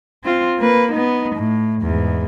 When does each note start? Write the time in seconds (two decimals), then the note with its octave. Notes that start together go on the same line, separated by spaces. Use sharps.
0.24 C4 F4
0.59 A#3 B4
0.92 B3 D#4
1.36 A2
1.82 E2 G#2